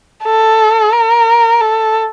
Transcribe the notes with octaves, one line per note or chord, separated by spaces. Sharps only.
A4
A#4
A4